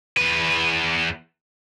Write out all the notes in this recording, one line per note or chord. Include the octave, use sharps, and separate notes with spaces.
E2 B4